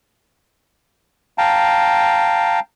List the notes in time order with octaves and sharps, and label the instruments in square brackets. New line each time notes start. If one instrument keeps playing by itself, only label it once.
[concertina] F5 G5 A5 A#5